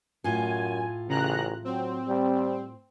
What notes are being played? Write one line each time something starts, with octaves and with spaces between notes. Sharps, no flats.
F#2 A2 F4 G#5
A1 C#3 A#5 F#6
F#3 C4
G3